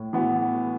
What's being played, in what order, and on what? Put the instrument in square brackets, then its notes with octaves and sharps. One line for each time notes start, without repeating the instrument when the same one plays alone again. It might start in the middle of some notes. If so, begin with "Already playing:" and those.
Already playing: [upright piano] A2
E3 B3 F#4